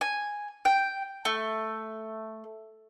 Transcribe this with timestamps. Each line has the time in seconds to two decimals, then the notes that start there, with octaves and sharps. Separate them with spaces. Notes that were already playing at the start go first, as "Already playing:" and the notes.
0.01 G#5
0.65 G5
1.25 A3